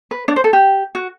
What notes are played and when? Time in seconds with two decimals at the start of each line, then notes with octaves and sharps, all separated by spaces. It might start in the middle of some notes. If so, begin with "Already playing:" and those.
0.11 B4
0.28 D4 D5
0.36 C5
0.44 A4
0.53 G4
0.95 F#4